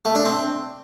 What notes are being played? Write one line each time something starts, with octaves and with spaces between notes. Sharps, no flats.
A3
D4
C4